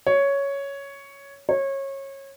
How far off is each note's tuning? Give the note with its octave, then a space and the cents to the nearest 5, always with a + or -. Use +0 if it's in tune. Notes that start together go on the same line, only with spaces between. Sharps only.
C#5 +5
C#5 -25